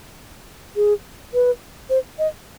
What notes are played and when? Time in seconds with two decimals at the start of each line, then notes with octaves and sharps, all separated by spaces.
0.76 G#4
1.34 B4
1.90 C5
2.19 D#5